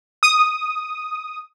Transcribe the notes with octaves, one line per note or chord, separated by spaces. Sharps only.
D#6